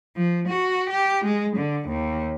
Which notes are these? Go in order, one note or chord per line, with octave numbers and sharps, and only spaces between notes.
F3
F#4
G4
G#3
D3
D#2